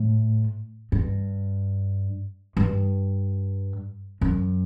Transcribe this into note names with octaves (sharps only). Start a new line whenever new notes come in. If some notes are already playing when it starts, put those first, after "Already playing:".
Already playing: A2
G2
G2
F#2